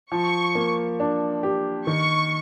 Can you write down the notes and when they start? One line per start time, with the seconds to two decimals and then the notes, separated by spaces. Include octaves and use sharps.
0.12 F3 C#6
0.55 A#3
1.00 D4
1.43 G4
1.87 D#3 C#6